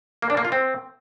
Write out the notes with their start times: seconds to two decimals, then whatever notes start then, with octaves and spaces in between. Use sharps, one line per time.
0.22 A#3
0.30 D4
0.37 A#3
0.45 F4
0.52 C4